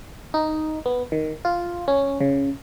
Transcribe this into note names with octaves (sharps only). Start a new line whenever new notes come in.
D#4
B3
D#3
F4
C#4
C#3